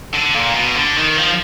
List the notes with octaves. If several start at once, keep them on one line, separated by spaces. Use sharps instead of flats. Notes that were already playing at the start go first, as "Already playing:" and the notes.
D3
A#2
B2
D3
D#3
F3